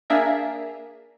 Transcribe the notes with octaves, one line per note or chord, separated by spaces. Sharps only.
A#3 D4 G#4 A#4 E5